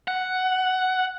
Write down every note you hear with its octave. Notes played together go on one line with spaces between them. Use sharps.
F#5